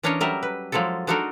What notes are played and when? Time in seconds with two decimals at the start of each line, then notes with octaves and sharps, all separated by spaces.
0.03 E3 C#4 D4 A#4 C#5 D#5
0.20 F#3 G3 A#4 D#5 E5
0.43 B4
0.72 F3 F#3 G#3 E4 A4
1.07 G#3 D4 D#4 F#4 A4 A#4